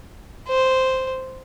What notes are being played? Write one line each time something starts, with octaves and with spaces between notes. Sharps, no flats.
C5